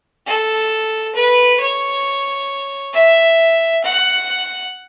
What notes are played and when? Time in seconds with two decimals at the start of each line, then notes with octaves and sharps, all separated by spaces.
0.27 A4
1.16 B4
1.61 C#5
2.94 E5
3.84 F#5